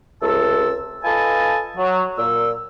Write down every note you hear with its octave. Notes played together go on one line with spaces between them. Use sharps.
C#2 C3 A3 A5 E6
F4 A4 B4 D#5 G#5 A5
F#3
A#2 E6